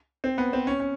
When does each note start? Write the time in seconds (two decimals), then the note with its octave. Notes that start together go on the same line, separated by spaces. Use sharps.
0.24 C4
0.38 B3
0.53 C4
0.67 C#4
0.80 C#4